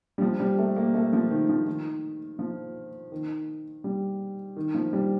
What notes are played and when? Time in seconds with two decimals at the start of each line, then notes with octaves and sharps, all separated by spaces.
0.18 G3
0.21 F3
0.40 G3
0.59 A3
0.76 A#3
0.94 A3
1.13 F3
1.30 D#3
1.49 F3
1.66 D#3
2.39 F3
3.12 D#3
3.84 G3
4.56 D#3
4.74 F3
4.93 G3